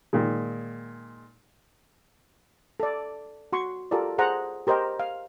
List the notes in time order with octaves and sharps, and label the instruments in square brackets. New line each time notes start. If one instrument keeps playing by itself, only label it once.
[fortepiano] A#2 D#3 G#3
[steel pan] A4 D5
F#4 C6 C#6
F4 G4 A4 A#4 D5
G#4 C5 F#5 A#5
G4 A#4 C5 D#5 G5
F5